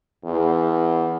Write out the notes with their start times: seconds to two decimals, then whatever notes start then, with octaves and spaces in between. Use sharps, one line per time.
0.25 E2